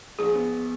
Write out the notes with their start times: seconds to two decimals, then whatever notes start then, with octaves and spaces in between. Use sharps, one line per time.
0.19 A#1 G#4
0.35 B3